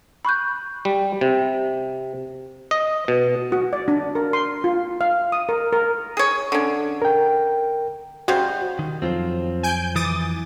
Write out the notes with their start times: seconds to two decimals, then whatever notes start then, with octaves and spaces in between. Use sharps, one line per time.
0.25 B5 C#6 F#6 G6
0.85 G3
1.21 C3
2.71 D#5
3.08 B2
3.52 F#4
3.73 D5
3.88 D4
4.15 A#4
4.33 C6
4.64 F4
5.01 F5
5.32 D#6
5.49 A#4
5.73 A#4
6.17 G#4 C#5
6.52 D3 C#4
7.02 A#4 G5
8.28 C#3 G3 F#4 C5
8.79 D#3
9.02 F2 F3 F#3 C4 F4 C5
9.63 G#5 G6 D7
9.96 E3 D6 D#6 A6